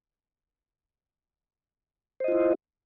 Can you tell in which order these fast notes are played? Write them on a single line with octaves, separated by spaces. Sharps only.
C5 D#5 F4 E4